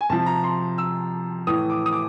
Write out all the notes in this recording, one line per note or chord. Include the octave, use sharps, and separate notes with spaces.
G#5
C3 F3 A5
A#5
C6
E6
A2 E3 D#6
D6
D#6
D6